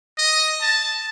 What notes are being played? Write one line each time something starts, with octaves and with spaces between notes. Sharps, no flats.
D#5
A5